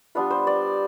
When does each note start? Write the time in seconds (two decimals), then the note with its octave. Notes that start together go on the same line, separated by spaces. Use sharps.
0.15 G3 B3 D4 F4 B4
0.31 C5
0.47 D5